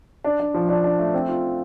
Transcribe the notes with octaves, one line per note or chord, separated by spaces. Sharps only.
D4
D4
F3
D4
D4
A3
C4
F4